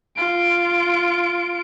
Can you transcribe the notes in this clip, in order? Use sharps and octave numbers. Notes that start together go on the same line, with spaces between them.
F4 D7